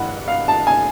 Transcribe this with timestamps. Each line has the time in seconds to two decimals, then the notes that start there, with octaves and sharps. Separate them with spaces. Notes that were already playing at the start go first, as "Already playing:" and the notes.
Already playing: G2 E3 F#5
0.28 F5
0.48 A5
0.67 G#5